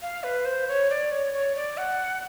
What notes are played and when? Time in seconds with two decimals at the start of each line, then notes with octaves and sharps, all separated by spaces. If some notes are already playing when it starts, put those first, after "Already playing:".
0.02 F5
0.24 B4
0.45 C5
0.68 C#5
0.90 D5
1.11 C#5
1.33 C#5
1.55 D5
1.78 F#5